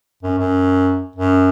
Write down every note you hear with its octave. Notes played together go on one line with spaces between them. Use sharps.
F#2
F#2
F#2